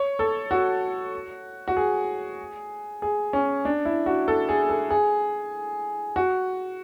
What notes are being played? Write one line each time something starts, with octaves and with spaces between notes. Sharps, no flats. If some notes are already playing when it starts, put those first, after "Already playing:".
Already playing: C#5
A4
F#4
F#4
G#4
G#4
C#4
D4
E4
F#4
A4
G#4
A4
G#4
F#4